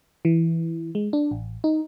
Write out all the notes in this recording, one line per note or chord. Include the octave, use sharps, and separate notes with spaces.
E3
G#3
D4
A1
D#4